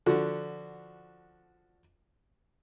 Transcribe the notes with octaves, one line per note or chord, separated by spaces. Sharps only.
D3 F3 F#4